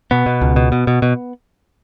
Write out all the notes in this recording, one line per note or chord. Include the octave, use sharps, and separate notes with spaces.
B2 B3
B2
C#2
B2
B2
B2
B2